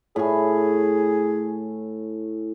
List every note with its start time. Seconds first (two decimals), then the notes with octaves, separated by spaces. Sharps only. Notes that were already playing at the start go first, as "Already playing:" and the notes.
0.16 A2 G#4 G#5